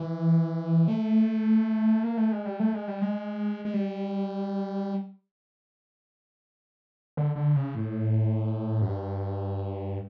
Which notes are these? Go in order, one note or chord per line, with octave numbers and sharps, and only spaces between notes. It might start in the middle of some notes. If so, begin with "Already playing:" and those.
Already playing: E3
A3
A#3
A3
G#3
G3
A3
G#3
G3
G#3
G#3
G3
D3
D3
C#3
A2
F#2
G2